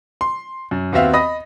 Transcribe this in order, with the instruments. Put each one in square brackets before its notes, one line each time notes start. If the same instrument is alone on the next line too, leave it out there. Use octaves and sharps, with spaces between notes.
[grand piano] C6
F#2
D#2 B3 C4 F#4 E5 F5
D#5 B5 D#6 A#6